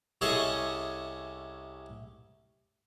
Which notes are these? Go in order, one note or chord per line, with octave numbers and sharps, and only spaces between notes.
C2 C#4 G#4 A4 D#5 E5